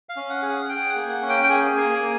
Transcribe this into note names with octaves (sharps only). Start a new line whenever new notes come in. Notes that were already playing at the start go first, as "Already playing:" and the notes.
F5
C#4
F#5
G#4
F#5
G#4 G5
F#5
A#3
F#5
C#4
G5
G5
G#4 G#5
A#3
A#3